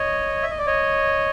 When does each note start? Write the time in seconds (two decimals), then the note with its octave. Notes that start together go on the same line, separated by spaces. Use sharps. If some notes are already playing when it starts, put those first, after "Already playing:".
Already playing: C#5 D#5
0.43 E5
0.51 D#5
0.58 D5
0.66 C#5 D#5